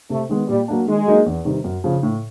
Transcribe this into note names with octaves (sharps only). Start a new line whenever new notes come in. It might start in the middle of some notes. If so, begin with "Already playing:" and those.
C3 A3
D#3 G#3 B3
A#2 G3
F#3 A#3 D4
D#3 G#3
F#3 A#3 D#4
E2
C3 D#3 G3
F#2
C#3 F3
A2